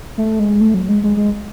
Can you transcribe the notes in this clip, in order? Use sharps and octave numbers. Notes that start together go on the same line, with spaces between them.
A3
G#3
A3
F#3
G#3
G#3
G#3